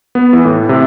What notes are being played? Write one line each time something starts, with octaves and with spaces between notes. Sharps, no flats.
B3
E3
A2
C3